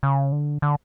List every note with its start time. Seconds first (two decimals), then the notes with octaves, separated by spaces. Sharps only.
0.03 C#3
0.32 D3
0.62 D3